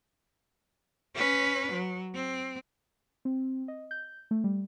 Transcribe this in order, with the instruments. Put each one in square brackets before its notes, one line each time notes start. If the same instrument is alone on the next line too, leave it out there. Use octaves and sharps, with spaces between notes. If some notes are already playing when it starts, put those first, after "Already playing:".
[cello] C#4 B4
F#3
C4
[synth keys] C4
D#5
G6
A3
G3